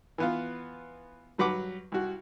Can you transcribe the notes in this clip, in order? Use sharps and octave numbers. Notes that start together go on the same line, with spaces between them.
E3 B3 F4
G2 F#3 B4 F#5 D6
C2 F#4